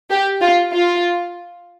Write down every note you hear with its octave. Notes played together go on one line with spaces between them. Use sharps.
G4
F4
F4